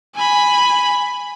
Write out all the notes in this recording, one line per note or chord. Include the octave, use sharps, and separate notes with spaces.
G#5 B5